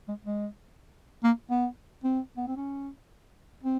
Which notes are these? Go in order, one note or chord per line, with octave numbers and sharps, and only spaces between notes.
G#3
G#3
A#3
B3
C4
B3
C4
C#4
C4